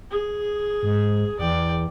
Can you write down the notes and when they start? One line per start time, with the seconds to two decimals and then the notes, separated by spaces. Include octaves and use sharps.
0.11 G#4
0.83 G#2
1.39 E2 D5 G5